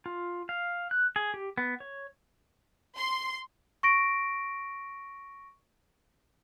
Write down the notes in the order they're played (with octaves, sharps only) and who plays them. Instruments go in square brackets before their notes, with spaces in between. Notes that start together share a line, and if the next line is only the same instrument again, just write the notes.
[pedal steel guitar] F4
F5
F#6
G#4
G4
B3
C#5
[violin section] C6
[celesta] C#6 A#6 D7